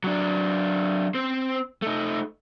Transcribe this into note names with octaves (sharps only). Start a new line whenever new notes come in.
F#3 D4
C4 C5
A3 D#4